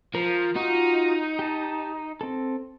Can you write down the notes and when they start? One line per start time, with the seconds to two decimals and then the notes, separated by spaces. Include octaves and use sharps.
0.15 F3 A#4 A#5
0.56 D#4 F4 F#4
1.39 G4 A5
2.21 C4 A4